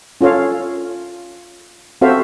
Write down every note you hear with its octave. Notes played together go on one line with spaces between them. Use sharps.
C#4 F4 A4 C#5 F5
C4 F#4 A4 C5 E5 F5